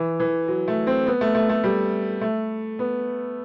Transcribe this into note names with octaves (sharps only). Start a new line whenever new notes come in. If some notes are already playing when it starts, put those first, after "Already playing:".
Already playing: E3
E3
F#3
A3
C4
B3
A3
A3
A3
G3
A3
B3